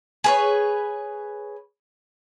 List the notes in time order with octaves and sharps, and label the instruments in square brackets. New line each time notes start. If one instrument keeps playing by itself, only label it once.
[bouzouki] G#4 B4 C#5